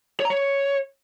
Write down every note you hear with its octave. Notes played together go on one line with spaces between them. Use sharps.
C#5
A#5
C#5